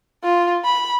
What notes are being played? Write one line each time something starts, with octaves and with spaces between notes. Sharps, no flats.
F4
B5